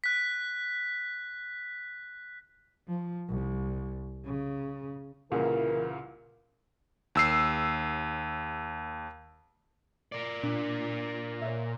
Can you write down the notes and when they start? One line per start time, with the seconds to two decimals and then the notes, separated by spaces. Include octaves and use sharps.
0.04 F#6 B6
2.88 F3
3.28 C2
4.25 C#3
5.32 C2 A#2 C#3 E3 A#4
7.15 D#2 E6 C7
10.12 A#4 D5
10.43 A#2 D4
11.41 A#2 C#5 E5